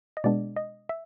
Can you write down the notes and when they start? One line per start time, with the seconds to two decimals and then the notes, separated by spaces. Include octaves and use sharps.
0.17 D#5
0.24 B2 G#3 B3 D4 D5
0.56 D#5
0.89 E5